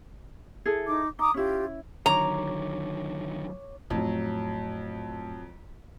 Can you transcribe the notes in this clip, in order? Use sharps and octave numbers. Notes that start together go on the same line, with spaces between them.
E4 G#4 A4
D#4 D6
D#4 A#5 D6 D#6
C#4 E4 F4 G4
D3 D#3 F#3 C#5 A#5 D6
F2 A2 F#3